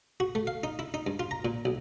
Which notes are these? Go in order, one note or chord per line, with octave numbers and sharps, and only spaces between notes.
F#4
A3
F5
D#4
E4
D#4
G2
F4
A#5
A#2
B1